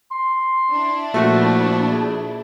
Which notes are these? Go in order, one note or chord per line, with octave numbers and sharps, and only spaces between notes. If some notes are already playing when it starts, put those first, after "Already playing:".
C6
D4 E4
A#2 F3 A3 F#4
G#4